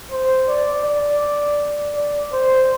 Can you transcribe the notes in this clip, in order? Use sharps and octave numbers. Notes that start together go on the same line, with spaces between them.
C5
D5
D5
D5
C5